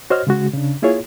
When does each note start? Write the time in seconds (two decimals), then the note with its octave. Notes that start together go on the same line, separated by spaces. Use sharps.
0.10 F#4 C5 C#5 D#5 F6
0.27 C#3 G#3 F#4
0.53 C#3 D4
0.82 A#3 E4 F4 G#4 C#5